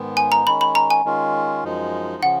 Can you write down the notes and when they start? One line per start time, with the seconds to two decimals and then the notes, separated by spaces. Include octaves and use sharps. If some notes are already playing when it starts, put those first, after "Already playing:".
Already playing: G#2 D#3 G#3 B3
0.17 G#5
0.32 A#5
0.46 D#3 G#3 C#4 B5
0.61 B5
0.75 A#5
0.90 G#5
1.05 D#3 G#3 C#4 F4
1.64 F#2 F3 G#3 D#4
2.23 C#3 F3 F#5